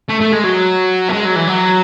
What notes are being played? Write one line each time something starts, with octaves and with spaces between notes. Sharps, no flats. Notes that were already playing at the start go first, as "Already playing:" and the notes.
A3
A3
G#3
F#3
A3
G#3
F#3
E3
F#3